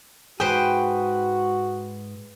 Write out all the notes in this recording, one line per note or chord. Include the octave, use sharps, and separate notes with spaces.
G#2 F#4 G#4 B4 C5 G5